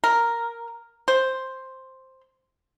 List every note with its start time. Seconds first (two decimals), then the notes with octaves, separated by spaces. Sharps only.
0.04 A#4
1.08 C5